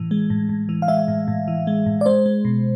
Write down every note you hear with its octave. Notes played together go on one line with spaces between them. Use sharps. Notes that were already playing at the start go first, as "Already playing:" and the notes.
Already playing: A2 E3
G#3
A2
A2
E3
F5
G#3 E5
A2
A2
E3
G#3
A2
D5
G#3 C5
G#3
B2